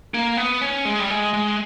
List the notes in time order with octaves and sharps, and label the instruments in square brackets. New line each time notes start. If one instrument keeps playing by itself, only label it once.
[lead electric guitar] A#3
B3
C#4
G#3
G3
G#3
G#3